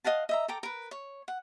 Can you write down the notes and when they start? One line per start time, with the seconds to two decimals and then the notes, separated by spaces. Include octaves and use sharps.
0.04 D#5 F5 F#5 A5
0.29 D#5 E5 A#5
0.48 A4 G5 A#5 D6
0.63 A#4 B4
0.91 C#5
1.28 F#5